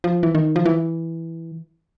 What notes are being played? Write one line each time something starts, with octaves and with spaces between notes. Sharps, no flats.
F3
E3
D#3
F3
E3